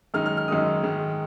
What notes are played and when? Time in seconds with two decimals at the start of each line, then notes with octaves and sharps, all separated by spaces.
0.14 F#2 D#3 G#3 D#4 F6
0.26 F6
0.37 F6
0.48 F#2 D#3 G#3 D#4 D#6
0.83 G#2 D#3 G#3